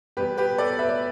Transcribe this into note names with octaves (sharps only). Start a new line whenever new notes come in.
E2 B2 G3 G4 B4
G4 B4
A4 D5
B4 E5
D5